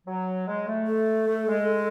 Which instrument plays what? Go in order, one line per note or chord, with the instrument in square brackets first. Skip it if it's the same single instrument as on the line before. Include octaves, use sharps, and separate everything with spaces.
[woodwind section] F#3
G#3
A3
[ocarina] A4
[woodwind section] A3
G#3